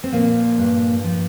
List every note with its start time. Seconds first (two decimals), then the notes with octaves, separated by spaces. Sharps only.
0.04 C4
0.12 A#2 F3 A#3
0.58 G2
1.04 F3